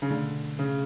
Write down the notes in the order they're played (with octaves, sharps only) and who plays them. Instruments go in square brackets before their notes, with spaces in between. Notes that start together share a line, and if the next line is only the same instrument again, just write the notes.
[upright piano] C#3
[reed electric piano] B2 A3 D4 [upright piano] D3
[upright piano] C#3